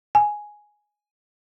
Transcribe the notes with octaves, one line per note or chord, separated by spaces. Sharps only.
G#5